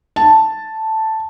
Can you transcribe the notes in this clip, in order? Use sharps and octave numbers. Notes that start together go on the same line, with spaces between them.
A5